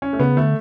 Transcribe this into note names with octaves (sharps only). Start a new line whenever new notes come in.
C#4
A3
C#3 B3
D3 A3